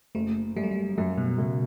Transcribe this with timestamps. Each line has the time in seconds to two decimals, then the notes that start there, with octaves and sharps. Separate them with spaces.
0.15 F#1 A3
0.56 F#2 G3
0.63 A3
0.71 G3
0.98 F#2 F#3
1.18 B2
1.38 F#2 C#3